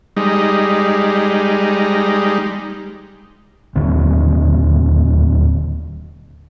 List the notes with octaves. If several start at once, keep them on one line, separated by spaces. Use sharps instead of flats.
G3 G#3 D#4
D1 D#2 D3 C4